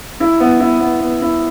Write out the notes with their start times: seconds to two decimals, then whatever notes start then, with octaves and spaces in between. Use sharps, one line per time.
0.20 E4
0.40 B3
0.60 E4
0.80 B3
1.00 B3
1.21 E4